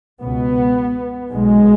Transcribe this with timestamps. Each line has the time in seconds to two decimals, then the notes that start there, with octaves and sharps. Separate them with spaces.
0.20 C#2 B2 B3
1.30 B1 B2 G#3